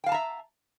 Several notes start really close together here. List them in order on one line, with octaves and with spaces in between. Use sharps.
G5 F5 A5 A#5 E5